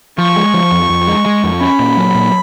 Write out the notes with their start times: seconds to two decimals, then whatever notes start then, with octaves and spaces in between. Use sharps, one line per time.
0.18 F3 C#6
0.36 G#3
0.54 F3
0.72 F2
0.90 F2
1.07 G#3
1.26 G#3
1.44 F2
1.61 C#4 B5
1.79 A#2
1.97 F#3
2.15 A#2